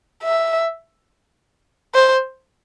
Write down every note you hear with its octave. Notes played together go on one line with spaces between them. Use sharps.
E5
C5